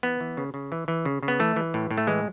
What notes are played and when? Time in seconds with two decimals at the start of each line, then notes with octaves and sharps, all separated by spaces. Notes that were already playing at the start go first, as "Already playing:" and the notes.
0.03 E3 B3
0.20 E3
0.37 C#3
0.54 C#3
0.72 E3
0.88 E3
1.05 C#3
1.23 C#3
1.28 B3
1.40 E3 A3
1.56 E3
1.74 A2
1.91 A2
1.98 A3
2.07 E3 G#3